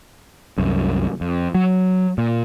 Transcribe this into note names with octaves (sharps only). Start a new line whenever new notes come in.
C2 F#2
F2
F#3
A#2